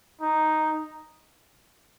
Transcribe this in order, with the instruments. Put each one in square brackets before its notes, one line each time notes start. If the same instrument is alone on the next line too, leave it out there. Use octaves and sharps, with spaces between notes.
[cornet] D#4